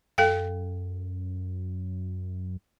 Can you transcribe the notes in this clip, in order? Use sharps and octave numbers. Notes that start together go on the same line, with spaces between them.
F#2 A4 F5 G5